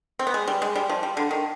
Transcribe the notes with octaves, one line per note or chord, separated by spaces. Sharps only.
C4
B3
G#3
G3
G#3
G3
F3
G3
D3
D#3